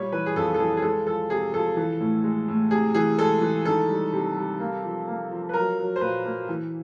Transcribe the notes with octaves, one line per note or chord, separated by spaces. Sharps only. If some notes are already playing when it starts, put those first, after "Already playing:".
Already playing: A#2 G3 C#5
E3 B4
G#4
F2 A4
A4
E3 G#4
G#4
G#3 A4
F3 A4
C3 G#4
F3 A4
E3
A2
G#3
A2
C3 G#4
E3 G#4
G#3 A4
E3
D#3 A4
G3
C3
G3
A#3
F3
A#3
F3
B4
F#3 A#4
F#3
C5
A#2 B4
A#3
E3